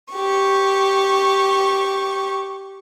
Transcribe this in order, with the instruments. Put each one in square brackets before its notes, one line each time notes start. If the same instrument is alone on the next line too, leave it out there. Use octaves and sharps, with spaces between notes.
[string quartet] G4 C#6